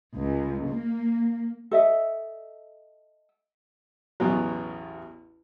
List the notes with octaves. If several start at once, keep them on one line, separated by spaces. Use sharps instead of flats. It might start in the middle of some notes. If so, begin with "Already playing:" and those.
C#2
A#3
A4 D#5 E5
A1 E2 B2 F#3